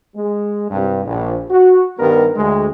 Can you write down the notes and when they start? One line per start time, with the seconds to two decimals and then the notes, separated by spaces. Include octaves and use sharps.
0.16 G#3
0.71 C2 G2
1.06 A#1
1.51 F#4
2.00 G2 D#3 G3 B3 A#4
2.36 D2 G#3